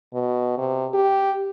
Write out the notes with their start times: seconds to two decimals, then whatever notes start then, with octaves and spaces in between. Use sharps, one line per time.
0.14 B2
0.58 C3
0.94 G4